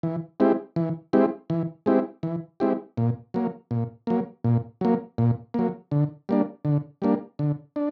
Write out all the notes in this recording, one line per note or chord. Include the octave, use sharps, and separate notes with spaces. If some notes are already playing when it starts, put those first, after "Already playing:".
E3
G#3 C4 E4 G4
E3
G#3 C4 E4 G4
E3
G#3 C4 E4 G4
E3
G#3 C4 E4 G4
A#2
F#3 A#3
A#2
F#3 A#3
A#2
F#3 A#3
A#2
F#3 A#3
D3
G3 A#3 D4
D3
G3 A#3 D4
D3
D4